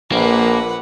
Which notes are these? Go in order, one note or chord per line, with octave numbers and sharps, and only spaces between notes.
A#1 A#3 B4 F#5